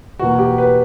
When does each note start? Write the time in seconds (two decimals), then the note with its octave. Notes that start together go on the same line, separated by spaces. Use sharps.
0.19 E2 B2 A#3 F#4
0.39 G4
0.58 B4